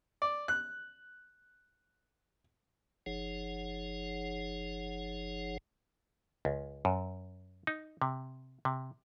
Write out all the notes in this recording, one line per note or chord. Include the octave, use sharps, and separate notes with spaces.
D5
F#6
F#1 F3 D#4 G#4 C#5 F#5
C#2
F#2
D#4
C3
C3